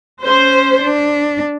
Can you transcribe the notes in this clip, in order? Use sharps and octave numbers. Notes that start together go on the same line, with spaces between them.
C#4 C5
D4